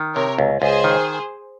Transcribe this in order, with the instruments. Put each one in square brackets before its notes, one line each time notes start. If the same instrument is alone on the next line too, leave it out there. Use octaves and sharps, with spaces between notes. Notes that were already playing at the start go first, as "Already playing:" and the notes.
Already playing: [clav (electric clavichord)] D#3
[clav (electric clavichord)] C3 [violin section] A#4 C#5
[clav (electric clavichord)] C#2
[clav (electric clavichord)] C#2 [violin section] G#4 C5
[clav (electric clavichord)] D#3